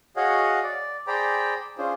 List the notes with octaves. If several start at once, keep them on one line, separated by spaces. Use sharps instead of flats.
F#4 G#4 C#5 D#5 F5 F#5
D5
G#4 C5 D5 G5 A#5 B5
C#4 D4 F4 G#4 C5